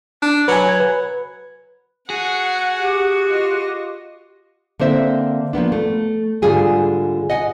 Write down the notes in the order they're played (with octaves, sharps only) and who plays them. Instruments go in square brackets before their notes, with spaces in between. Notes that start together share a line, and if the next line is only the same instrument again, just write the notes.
[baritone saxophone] D4
[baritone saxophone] F#3 [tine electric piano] B4 G#5
[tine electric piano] G#6
B4
[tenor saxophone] F#4 [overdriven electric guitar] G#4 [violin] F#5
[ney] G4
[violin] F4 D#5
[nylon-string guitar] D3 A#3 C4 C5 E5
F3 A#3 B3 D4
A3
G#2 D3 G3 F4 G#4 G#5
D#5 F#5 G#5